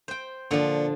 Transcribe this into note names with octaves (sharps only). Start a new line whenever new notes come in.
C5 G5
A#2 D3 F3